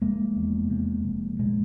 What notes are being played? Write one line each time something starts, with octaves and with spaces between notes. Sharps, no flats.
F1 G#3 A#3
E2
C3
F1
A#2 G#3 A#3